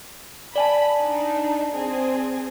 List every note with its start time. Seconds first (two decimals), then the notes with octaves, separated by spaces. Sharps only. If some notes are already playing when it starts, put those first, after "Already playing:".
0.56 D5 G#5 A5 B5
1.01 D4 D#4
1.73 C4 G#4